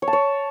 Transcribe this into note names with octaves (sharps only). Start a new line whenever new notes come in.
C#5
A5
C#5